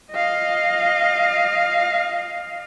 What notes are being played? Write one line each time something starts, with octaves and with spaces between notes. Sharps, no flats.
D#5 F5